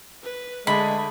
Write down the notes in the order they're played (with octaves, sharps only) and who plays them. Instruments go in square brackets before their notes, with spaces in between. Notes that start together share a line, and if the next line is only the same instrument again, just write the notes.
[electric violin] B4
[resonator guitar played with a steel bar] D3 A3 [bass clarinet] G#3 [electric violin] G#4 [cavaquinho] B5